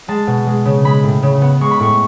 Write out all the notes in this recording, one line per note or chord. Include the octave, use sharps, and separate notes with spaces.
G#3 A5
B2
G#3
C#3
G#3 B5
A2
C#3
B3
G#3 C#6
B5
A2 C#6